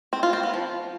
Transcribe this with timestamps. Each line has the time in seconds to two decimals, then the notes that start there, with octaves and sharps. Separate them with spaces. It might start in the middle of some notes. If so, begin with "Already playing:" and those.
0.13 C4
0.23 F4
0.33 C4
0.43 B3
0.54 F3